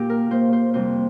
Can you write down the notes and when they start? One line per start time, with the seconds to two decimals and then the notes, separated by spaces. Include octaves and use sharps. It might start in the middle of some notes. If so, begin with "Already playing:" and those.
Already playing: A#2 A#3 G4
0.10 A#4
0.30 A#2 A#3 C5
0.53 C5
0.74 F2 C3 G3 C5